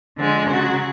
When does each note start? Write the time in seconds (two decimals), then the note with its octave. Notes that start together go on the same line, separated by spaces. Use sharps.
0.18 D3 F3 G#3
0.49 C#3 F#3 F#4